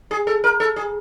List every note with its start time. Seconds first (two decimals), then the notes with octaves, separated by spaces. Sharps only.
0.11 G#4
0.27 A4
0.44 A#4
0.60 A4
0.76 G#4